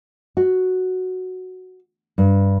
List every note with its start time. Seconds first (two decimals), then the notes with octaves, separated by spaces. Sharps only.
0.37 F#4
2.18 G2